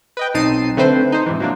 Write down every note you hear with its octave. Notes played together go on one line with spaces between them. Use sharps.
B4 D#5 G5
B1 C4 D#4 A5 C7 D#7
D3 A3 C4 B4 C5
D#4 C5
G#2 C3 E3
F#3 A#3 D4